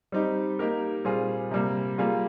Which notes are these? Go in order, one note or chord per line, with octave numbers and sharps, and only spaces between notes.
G3 C4 D#4 G4
A#3 D#4 G4 A#4
A#2 G3 C4 F4 G#4
C3 G3 A#3
G3 A#3 F4 G#4